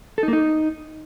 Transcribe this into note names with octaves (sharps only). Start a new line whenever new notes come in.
A4
D#4
A#3
D#4